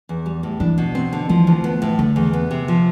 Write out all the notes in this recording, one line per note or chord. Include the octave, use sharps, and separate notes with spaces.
E2
G3
A2
E3 D4
B2
C4
D3
E3 F3
D2
B3
A2
D3 A3
E2
B3
C3
F3